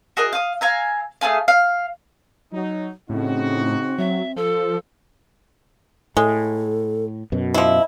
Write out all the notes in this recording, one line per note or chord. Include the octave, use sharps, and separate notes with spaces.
F#4 G#4 A#4 D#5
F5 D#6
F5 G#5 A#5 E6
A3 D#4 G#4 F5
F5
F#3 D#4
A2 C#3 C4 D#4 F#4
F#3 E5
F3 A4
A2 G#3 A4
F#2 B2
F3 E4 D#5